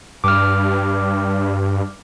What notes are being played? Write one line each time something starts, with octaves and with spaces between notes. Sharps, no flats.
G2 D6 F6